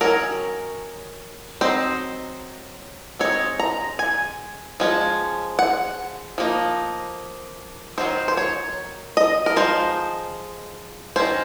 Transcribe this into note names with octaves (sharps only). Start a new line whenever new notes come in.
D#3 F#3 C#4 A#4
F#3 C4 D#4 C5
G#3 C4 D#4 C#5
A#5
G#5
F3 G#3 C#4
F#5
F3 A#3 D#4
D#3 F#3 C4 D#4 C5
C5
C#5
D#5
A#4
F3 G#3 D#4 C5
D#3 F#3 C#4 C5